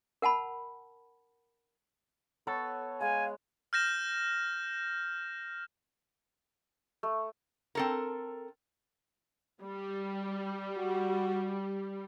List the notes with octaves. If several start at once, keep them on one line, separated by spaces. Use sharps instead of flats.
A#4 F#5 A5 B5
B3 A4 C#5 C#6
G#3 F5 G#5
F6 G6 A#6 E7
A3
C4 A4 A#4
G3
F#4